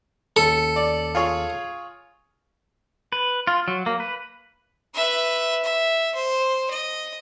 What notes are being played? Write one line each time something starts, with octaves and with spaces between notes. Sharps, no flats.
D#2 C#4 A4 C#7
D5
F4 G#4 C#5
B4
F4
F#3
A#3
B4
B4 E5
E5
C5
D#5